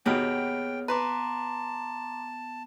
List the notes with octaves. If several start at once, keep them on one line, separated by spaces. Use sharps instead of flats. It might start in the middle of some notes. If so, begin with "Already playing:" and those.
D#2 B2 B3 G#4 C#5 G5 F6
B4 A5 A#5 C6 D6